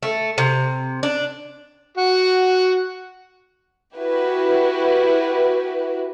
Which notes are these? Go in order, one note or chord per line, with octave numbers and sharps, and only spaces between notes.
A3
C3
D4
F#4 F#5
E4 F#4 G4 B4